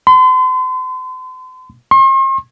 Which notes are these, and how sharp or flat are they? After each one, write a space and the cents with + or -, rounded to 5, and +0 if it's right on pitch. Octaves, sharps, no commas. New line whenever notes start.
C6 -40
C6 +45